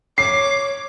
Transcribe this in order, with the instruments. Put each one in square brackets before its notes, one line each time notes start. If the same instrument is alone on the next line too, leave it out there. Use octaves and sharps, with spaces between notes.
[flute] C#5 [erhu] D6 [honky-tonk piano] C7